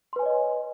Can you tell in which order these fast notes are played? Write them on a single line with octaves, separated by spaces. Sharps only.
C6 B4 G#5 C#5 D#5